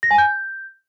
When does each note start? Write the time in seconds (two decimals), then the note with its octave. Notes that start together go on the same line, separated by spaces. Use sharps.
0.03 A#6
0.11 G#5
0.18 G6